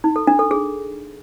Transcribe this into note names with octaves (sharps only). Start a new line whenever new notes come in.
D#4
A4
D4
A4
G#4